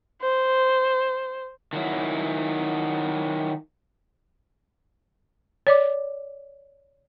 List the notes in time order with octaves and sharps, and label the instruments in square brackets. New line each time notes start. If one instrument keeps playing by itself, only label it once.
[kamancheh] C5
[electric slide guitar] D#3 F#3 E4
[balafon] C#5 D5 D6